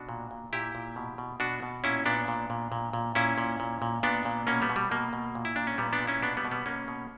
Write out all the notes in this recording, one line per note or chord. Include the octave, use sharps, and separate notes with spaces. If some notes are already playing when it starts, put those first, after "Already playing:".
Already playing: B2 D4 F#4
A#2
A#2
A#2 E4 G4
A#2
B2
B2
B2 D4 F#4
B2
A#2 C#4 E4
A#2 B3 D4
A#2
A#2
A#2
A#2
A#2 C#4 E4
A#2
A#2
A#2
A#2 B3 D4
A#2
B2 A#3 C#4
G3 B3
B2
G3
B2 A#3
B2
A#2
E4
A#2 D4
C#4
A#2 G3 B3
B3 D4
A#2
C#4 E4
B2 B3 D4
G3 B3
B2
G3 B3
B2 A#3 C#4
B2